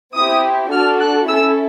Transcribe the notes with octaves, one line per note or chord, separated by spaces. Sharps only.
C4 E4 G4 D#6
D4 F#4 A4 F6
F#6
C#4 E4 A4 E6